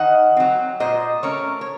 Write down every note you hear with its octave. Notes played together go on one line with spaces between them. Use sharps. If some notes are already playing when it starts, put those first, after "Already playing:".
Already playing: D#3 D#5 F#5
F#3 C4
A#2 C5 D#5
A3 C#4 A#4 C#5
C#5